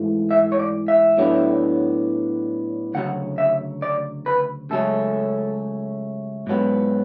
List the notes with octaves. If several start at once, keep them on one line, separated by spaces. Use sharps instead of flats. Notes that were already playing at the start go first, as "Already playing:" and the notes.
Already playing: G#2 E3 A3
E5
C#5
D5
E5
A2 F#3 B3 D4
D2 C#3 F#3 F#5
E5
D5
B4
C#2 C#3 F#3 A3 C#4 A4
G#2 F#3 B3